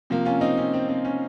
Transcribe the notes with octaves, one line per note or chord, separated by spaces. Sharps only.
C3 F3 A#3
C#4 F4
C4 D#4
C#4
C4
C4
C#4